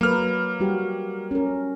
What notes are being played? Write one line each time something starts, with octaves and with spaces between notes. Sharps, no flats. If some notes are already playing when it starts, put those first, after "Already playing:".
F#3 A#3 A#4 B4 F6
G3 F#4 G4
C#4 A#4